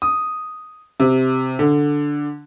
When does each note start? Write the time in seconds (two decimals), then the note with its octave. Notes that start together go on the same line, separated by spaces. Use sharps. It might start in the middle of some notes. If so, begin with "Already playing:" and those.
0.02 D#6
1.00 C3
1.59 D3